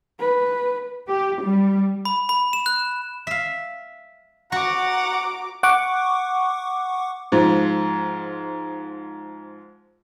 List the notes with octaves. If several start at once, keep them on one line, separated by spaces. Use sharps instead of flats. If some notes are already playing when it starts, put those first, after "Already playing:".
B4
G4
G3
B5
B5
E7
F#6
E5 F5
F#4 F#5 A#5 D6
F#5 C#6 D6
G#2 F3